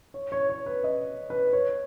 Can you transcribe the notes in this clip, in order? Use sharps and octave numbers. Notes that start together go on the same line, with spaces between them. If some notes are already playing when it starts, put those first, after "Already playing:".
C#5
C#5
C#5
B4
D#5
B4
C#5